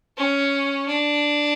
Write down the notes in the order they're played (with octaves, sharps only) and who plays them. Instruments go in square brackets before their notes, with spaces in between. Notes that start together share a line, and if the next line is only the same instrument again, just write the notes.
[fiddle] C#4
D4